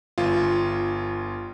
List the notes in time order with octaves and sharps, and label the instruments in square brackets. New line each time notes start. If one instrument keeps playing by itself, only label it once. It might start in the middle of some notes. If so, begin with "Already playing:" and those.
[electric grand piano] G1 F4